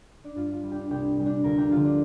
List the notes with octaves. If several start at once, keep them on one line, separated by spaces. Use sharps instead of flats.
D4
G2 F4
F4
G3
D4 G4
C2 D4 G4
A#2 G3
D4 G4
D2 F4 A#4
D4 G4
D3 F3 F4
D4